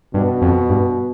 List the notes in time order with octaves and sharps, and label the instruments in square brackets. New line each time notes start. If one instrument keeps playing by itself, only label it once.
[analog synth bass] G2 [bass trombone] B2
[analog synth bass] F2
G2